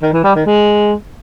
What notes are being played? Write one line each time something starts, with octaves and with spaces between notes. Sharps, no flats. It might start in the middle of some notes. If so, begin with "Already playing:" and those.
D#3
E3
G3
D#3
G#3